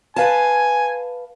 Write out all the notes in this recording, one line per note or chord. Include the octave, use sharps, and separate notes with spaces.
B4 F5 G#5 A5